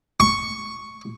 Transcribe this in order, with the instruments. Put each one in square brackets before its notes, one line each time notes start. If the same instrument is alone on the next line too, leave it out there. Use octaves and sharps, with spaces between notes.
[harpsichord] C#6